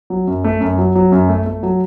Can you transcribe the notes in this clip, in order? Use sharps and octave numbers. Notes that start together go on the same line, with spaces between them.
F#3
F#2
A3
F#2
F#3
F#3
F#2
A3
A3
F#3